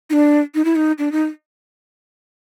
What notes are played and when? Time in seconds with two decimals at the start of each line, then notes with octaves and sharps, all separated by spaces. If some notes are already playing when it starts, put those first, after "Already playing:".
0.10 D#4
0.13 D4
0.55 D#4
0.65 E4
0.76 D#4
0.98 D4
1.12 D#4